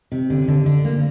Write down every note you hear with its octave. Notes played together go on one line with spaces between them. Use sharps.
C3
D3
D3
D3
A#3